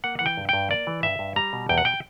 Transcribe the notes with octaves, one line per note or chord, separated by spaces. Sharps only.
A#3 F#5
E3 F#5
G5
G2
G2 G5
A#3 D5
E3
G2 E5
G2
G3 A#5
B2
E2 G5
F#5
G5